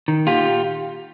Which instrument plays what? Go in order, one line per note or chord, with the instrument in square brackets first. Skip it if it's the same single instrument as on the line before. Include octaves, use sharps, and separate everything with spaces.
[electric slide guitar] D#3
A#2 F4 G4